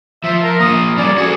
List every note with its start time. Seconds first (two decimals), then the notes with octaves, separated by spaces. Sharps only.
0.24 F3 E5
0.43 A#4
0.60 F3 A#3 D#6
0.98 G3 C#4 D5
1.17 F#4 G#4 A4